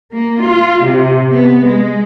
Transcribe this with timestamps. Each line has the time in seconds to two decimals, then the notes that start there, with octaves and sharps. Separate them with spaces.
0.12 A#3
0.42 F4
0.84 C3
1.31 B3
1.64 G#3